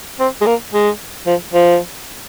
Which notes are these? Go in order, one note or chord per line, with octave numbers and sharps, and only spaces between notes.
C4
G#3
A#3
G#3
F3
F3